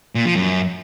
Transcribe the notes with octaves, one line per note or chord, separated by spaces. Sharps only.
A#2
F3
F#2